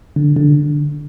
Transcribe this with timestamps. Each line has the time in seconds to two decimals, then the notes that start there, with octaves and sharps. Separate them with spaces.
0.16 D3
0.36 D3